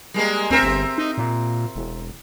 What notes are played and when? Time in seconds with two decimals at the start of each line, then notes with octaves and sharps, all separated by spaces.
0.14 G3 G#3 A#3
0.51 D2 C4 A#4 E5
0.63 G1
0.98 D#4
1.18 A#2
1.76 E1